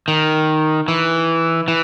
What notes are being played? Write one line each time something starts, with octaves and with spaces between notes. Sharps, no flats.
D#3
E3
E3